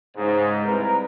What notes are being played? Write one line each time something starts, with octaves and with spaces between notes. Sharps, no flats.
G#2 C#3
C2 A#4 B4